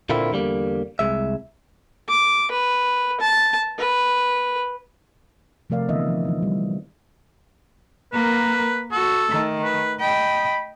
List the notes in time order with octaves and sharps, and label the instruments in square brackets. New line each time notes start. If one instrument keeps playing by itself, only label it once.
[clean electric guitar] A#2 D3 A#3 C4 E4
E2 D3 G3 A#3
C2 G#3 E5
[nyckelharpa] D6
B4
A5
B4
[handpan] C3 F3 A3 A#4 D5 F5
D3 E3 B3 D#5 E5
F3
E3 F#3 D#4
G3
[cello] A#3 A#4 [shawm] B4
[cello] F#4 [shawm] A4
[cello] D#3 A3
[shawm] B4
[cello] D#5 G5 [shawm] B5